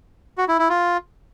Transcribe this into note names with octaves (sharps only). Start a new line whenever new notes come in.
F#4
E4
E4
F4